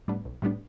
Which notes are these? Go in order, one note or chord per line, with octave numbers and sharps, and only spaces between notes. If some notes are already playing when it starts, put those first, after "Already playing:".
A2 G3 B3 D4
B1
A2 G3 B3 D4